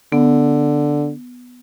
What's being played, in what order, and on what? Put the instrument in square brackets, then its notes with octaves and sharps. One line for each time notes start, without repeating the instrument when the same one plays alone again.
[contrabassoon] D3 [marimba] B3